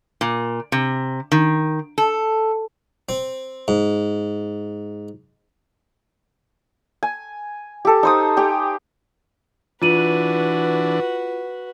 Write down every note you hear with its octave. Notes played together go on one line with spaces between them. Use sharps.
A#2
C3
D#3
A4
C4
G#2
G#5
G4 A4
D#4 C5 D#6
G4 G5 G#5
E3 D4 F4 F#4 B4 D#7 F#7